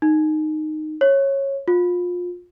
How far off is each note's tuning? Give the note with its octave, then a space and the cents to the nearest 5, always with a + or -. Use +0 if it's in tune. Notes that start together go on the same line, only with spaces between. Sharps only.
D#4 -10
C#5 -15
F4 +25